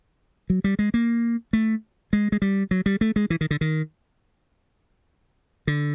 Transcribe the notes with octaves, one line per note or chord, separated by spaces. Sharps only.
F#3
G3
G#3
A#3
A3
G#3
G#3
G3
F#3
G3
A3
G#3
E3
D#3
D3
D#3
D3